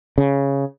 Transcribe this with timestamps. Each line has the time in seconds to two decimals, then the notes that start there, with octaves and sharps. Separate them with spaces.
0.18 C#3